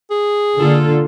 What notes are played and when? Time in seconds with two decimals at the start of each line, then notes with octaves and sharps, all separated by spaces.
0.10 G#4
0.60 D3 A#3 F4 A4